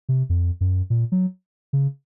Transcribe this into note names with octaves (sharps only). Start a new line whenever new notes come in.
C3
F2
F#2
A#2
F#3
C#3